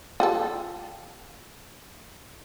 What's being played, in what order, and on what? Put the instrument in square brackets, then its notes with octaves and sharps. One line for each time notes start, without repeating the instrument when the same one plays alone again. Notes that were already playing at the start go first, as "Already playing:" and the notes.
[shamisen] F4 G4 A4